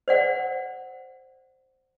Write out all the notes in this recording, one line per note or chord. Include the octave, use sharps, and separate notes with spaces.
C5 D5 F#5